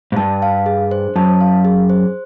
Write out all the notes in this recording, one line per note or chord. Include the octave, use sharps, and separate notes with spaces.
G#2
G2 A5
F5
G#4
C5
F#2 A5
F5
G#4
C5